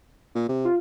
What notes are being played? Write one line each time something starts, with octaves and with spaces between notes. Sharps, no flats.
A#2
C3
F4